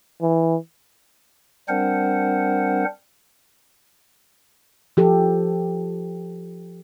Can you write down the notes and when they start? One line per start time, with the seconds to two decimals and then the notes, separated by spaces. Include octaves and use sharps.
0.22 E3
1.69 G3 C4 D4 A#4 C5 F#5
4.97 F3 G4 A4